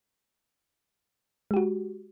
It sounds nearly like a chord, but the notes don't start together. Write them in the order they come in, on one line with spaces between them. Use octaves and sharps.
G#3 G4 F#4